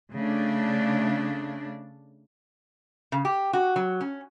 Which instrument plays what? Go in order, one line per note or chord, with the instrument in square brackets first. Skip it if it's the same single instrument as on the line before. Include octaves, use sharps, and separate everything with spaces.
[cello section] C#3 A3 D4
[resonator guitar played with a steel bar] C#3
G4
F#4
F#3
C#4